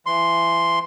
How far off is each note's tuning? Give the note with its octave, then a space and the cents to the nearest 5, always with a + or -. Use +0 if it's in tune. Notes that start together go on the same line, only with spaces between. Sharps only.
E3 +30 C6 +0